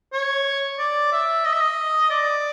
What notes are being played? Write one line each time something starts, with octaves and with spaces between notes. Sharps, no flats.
C#5
D5
E5
D#5
E5
D#5
D5